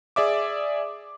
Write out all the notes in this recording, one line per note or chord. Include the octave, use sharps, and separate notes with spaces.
G#4 D5 E5 D6